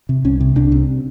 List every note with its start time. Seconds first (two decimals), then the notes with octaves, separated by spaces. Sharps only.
0.09 C3
0.25 C2 C#4
0.40 C3
0.56 C2 D4
0.72 C3